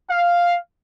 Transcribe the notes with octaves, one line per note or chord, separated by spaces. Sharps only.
F5